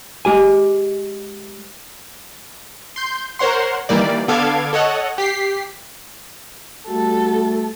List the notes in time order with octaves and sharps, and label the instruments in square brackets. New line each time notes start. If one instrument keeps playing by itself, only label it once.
[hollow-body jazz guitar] G#3 G4 G#5
[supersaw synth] C6 G6
A#4 C5 C#5 F#5 C6
D#3 E3 G3 A#3 D5
D3 B3 A4 F5 D6 G#6
A4 C#5 D#5 F#5
G4 B6 C7
[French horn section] G3 A3 F#4 [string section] A4